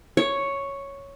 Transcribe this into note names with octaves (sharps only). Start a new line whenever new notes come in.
C#5